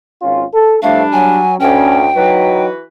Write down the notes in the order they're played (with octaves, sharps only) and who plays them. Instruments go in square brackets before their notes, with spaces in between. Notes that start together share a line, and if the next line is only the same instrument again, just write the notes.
[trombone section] G#1 C#4 F4
A4
[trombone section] A2 F3 A3 [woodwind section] G3 D4 [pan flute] F5
[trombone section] F#3 [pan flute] G#5
[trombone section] D2 [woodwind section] C#4 [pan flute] G5
[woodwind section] E3 F#4 B4 [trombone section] F#3 D#4